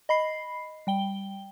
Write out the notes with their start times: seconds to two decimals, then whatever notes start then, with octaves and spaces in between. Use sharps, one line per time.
0.09 D#5 B5 C7
0.87 G3 G5 G7